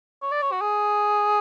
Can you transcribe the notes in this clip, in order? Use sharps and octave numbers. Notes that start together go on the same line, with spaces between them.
C#5
D5
C#5
F#4
G#4